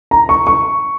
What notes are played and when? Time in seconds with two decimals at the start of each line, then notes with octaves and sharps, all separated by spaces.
0.11 A#5
0.29 C#6
0.47 C#6